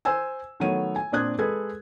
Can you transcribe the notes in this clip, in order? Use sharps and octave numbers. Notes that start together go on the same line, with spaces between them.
C5 G#5 E6
D#3 F#3 A3 B3 C#5 D#7
G#5
A#2 C4 D4 D#6 F#6 G#6
G#3 G#4 A4 B4 G#6